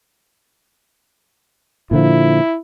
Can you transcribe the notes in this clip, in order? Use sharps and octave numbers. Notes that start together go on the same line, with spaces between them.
A#2 D3 F3 E4